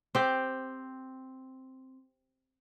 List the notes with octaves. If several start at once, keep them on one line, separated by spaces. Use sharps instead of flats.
C4 G4